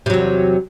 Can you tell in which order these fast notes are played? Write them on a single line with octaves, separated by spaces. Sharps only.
C3 F#3 E2